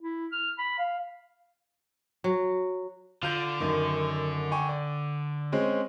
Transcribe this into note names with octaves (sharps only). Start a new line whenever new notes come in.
E4
F6
B5
F5
F#3
D3 F4 G6
F#2 D#3
G5 G#5 C#6
D5
G#3 C4 C#4